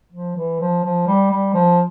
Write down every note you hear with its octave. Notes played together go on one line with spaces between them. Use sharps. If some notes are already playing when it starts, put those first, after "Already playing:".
F3
E3
F3
F3
G3
G3
F3